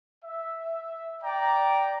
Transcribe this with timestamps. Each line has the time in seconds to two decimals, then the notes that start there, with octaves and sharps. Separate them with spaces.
0.25 E5
1.23 D5 G5 A#5